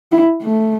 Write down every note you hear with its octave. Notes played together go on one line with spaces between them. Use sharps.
E4
A3